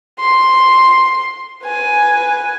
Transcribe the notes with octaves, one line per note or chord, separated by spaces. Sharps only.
C6
B4 G#5